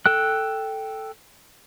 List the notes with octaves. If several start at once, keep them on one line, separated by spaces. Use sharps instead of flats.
A4 G5 F#6